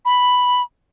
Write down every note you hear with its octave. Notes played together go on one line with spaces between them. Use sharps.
B5